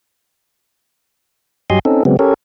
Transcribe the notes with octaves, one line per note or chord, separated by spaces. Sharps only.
G2 F#3 G4 D#5 G#5 C6
C4 C#4 D#4 A4
C#3 F#3 G#3 B3 C4
C#4 G4 A4 A#4 C#5